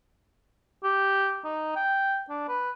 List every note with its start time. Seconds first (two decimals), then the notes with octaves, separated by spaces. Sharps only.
0.84 G4
1.44 D#4
1.76 G5
2.29 D4
2.48 B4